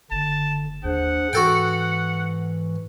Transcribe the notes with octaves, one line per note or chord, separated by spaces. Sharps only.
F#1 D3 A5
D#2 D4 G#4 C5 F#5
G#2 E3 F#4 A4 G5